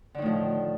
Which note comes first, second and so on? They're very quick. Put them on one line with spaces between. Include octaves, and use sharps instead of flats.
D3 D#3 A2 F3